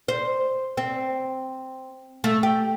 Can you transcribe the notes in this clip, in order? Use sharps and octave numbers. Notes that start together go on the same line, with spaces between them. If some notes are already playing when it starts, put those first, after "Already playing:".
C5
C4
A3
G4